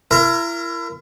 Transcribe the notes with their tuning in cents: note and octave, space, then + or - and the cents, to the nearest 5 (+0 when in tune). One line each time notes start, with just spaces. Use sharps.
E4 +35 A#4 -10